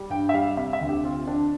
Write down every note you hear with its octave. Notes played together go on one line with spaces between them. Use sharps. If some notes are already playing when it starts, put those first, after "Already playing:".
Already playing: G3
G2 G5
E5
G3 F5
C3 E5
E5
D2
G4
C4 F4
C4 D4